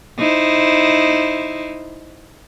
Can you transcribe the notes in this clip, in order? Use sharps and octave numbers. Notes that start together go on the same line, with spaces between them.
D#4 E4 C5